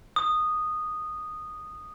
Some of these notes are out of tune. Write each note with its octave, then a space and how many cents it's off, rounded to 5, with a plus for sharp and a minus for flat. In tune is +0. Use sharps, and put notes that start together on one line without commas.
D#6 -10